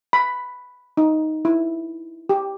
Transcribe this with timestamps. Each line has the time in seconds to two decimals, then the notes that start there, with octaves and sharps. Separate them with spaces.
0.13 B5
0.97 D#4
1.45 E4
2.29 G4